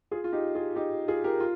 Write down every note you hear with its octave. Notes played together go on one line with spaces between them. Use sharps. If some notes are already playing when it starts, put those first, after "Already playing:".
F4 G#4
F4
D#4 G4
F4 G#4
D#4 G4
F4 G#4
G4 A#4
F4